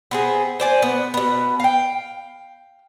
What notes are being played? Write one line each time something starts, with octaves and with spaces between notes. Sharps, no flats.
B3 C4 G#4
C5 D5 G#5
B3
B2 B3
F5 G5